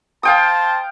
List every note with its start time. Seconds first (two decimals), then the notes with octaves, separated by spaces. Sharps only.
0.23 C5 F5 G5 A5 D#6